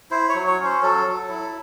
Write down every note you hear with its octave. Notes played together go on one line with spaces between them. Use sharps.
E4 C5
C#5
F#3
C#5
C#4 C5
F#3 A4
F#3
E4